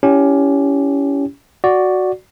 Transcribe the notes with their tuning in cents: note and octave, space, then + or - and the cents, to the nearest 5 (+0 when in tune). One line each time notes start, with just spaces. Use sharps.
C#4 +20 E4 +0 G4 +0
F#4 +0 D5 +0